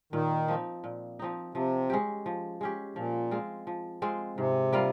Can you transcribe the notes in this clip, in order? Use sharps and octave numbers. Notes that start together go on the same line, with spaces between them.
A#2 D#3
F3 C4 D#4
A#2
F3 C4 D#4
C3 F3
G#3 C#4 G4
F3
G#3 C#4 G4
A#2 F3
G#3 C4 F4
F3
G#3 C4 F4
G#2 C3
G3 A#3 F4